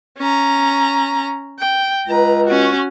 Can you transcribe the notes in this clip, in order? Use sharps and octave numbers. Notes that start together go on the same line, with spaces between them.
C#4 A#5
G5
C#2 B4 A#5
C#4 F#4